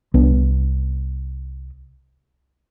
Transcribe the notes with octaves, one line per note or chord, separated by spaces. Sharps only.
C2 B3 D4